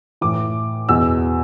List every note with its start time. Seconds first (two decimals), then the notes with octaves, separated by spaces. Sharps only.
0.21 A2 E3 D6
0.89 E2 B2 E6